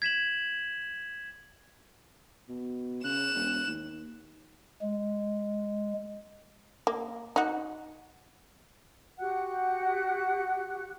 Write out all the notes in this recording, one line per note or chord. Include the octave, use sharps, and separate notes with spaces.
G#6 B6 E7 F#7
B2
C#3 F#6 E7
E1
D#2
G#3
A#3
D#4 F#4
F#4 G4 F#5 F#6